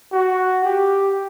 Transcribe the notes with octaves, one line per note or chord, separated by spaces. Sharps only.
F#4
G4